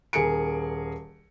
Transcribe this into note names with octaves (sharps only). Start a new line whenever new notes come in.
D#1 G#4 A#4 C#7 D7